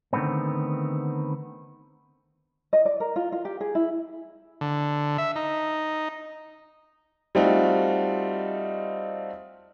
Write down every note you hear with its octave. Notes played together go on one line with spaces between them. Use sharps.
D3 D#3 F#3 A3 B3 C4
D#5
D5
A#4
F4
F4
G4
G#4
E4
D3
E5
D#4
G3 A3 C4 D#4 F4 F#4